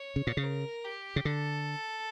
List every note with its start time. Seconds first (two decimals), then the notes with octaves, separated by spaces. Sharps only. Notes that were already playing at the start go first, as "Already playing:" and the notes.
Already playing: C#5
0.16 C#3
0.27 A#2
0.37 C#3
0.43 A#4
0.84 G4
1.16 C#3
1.25 D3 A4